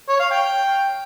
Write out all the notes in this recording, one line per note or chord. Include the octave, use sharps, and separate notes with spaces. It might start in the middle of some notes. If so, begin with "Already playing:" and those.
C#5
F5
G5